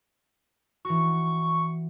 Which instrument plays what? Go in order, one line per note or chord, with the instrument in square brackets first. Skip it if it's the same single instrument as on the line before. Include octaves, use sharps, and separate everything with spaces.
[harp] E3 F#4 [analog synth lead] C#6